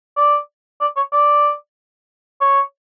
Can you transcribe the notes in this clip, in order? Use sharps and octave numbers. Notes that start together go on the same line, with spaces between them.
D5
D5
C#5
D5
C#5